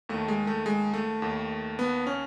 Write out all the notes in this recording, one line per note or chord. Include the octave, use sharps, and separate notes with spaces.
D#2 D#3 A3
G#3
A3
G#3
A3
D#2 D#3
B3
C#4